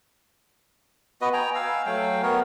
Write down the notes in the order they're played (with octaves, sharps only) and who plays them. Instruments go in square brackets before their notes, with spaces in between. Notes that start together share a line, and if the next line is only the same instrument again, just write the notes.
[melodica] B3 F#4 B4 D#5
G5 G#5 A#5
F5 G#5 E6
F#3 A3 F5 G5
B3 A#4 C#5